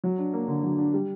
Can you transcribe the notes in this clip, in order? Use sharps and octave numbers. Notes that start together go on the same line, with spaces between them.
F#3
D4
A#3
D3
F#3
D4
G3